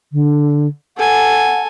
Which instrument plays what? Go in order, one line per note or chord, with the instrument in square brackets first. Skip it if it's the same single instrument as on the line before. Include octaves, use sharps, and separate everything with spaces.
[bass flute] D3
[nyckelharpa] A4 G#5 [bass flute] F#5